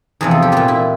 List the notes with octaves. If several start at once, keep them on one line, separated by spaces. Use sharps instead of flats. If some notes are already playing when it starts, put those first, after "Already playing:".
E2 C3 F3 G#4
A4
G4
A#2 G3 F4
E4